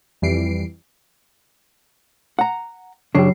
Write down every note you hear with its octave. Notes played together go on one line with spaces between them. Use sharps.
F2 E3 G3 C7 D7
F#5 A#5
F#2 C#3 F#3 D4 C7